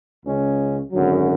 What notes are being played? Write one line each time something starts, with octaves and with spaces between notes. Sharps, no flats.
C#2 C#3 G#3 C#4
G#1 F#2 D3 F#3